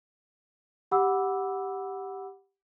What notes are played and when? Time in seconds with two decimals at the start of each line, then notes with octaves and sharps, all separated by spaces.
0.91 G4 F#5 B5 D6 E6